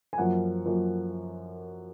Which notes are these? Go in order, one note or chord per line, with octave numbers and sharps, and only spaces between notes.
G#5
F#2 F3 A#3 F#5
F#2 F3 A#3